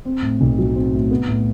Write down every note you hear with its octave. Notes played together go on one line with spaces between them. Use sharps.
C4
A2
B1
F#3
C4
A2
B3
A2